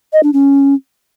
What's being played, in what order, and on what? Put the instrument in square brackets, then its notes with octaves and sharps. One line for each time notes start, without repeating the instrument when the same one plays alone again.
[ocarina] D#5
D4
C#4